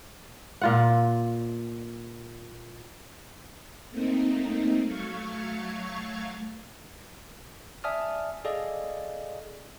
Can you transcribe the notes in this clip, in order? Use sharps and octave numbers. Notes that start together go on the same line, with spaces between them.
A#2 F4 F#5
A3 A#3 C4 D#4
F#3 A3 F5 C#6 G#6
D5 E5 G#5 A5 D#6 F6
G#4 A4 D5 D#5 F5